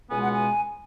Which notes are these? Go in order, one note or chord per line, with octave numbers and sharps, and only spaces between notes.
C#2 B2 G#3 B3 G#5
F#5
G#5